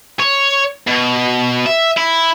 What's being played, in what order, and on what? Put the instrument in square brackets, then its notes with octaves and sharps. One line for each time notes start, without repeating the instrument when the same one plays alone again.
[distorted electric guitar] C#5
B2
E5
E4